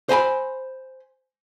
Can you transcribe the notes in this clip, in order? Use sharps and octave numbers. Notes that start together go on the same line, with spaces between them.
C5 G#5 A#5 B5